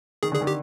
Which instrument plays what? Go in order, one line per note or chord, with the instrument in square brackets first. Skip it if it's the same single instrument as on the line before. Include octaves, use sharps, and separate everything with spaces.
[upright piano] D#3 [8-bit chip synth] G#4
[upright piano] D3
[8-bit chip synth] G#4
[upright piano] D#3
[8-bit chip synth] G4